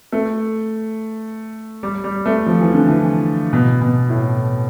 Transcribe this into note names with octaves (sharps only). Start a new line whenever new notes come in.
A3
G3
G3
A3
F3
E3
D3
E3
B2
B2
A2